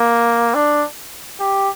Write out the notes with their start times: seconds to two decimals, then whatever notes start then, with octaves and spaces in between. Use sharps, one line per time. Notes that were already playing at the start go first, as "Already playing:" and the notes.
Already playing: A#3
0.55 D4
1.39 G4